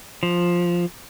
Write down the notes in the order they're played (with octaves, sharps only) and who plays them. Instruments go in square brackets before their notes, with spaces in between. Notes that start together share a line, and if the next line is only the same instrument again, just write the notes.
[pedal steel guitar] F3